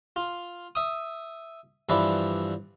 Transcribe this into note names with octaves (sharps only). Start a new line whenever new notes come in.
F4
E5 D#6
G2 E3 F3 B4 D5 E5